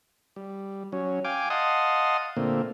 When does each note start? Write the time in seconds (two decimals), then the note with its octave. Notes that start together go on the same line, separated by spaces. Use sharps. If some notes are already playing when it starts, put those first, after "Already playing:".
0.36 G3
0.92 F#3 C#4
1.25 F5 G5 G#5 D6
1.50 D#5 F5 F#5 A5 C6 D#6
2.37 A#2 D3 A3 A#3 C4